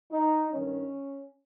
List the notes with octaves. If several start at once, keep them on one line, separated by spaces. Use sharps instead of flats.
D#4
G2 D#3 C#4